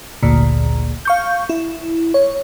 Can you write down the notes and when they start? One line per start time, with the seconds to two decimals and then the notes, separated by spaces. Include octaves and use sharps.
0.23 G#1 D2 A#2
1.05 F5 C#6 G6
1.49 E4
2.14 C#5